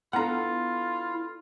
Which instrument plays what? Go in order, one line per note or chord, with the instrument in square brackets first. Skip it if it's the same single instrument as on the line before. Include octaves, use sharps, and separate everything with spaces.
[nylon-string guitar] B3 D4 A4 [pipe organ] E4 [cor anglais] F4 [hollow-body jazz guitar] F#5 A#5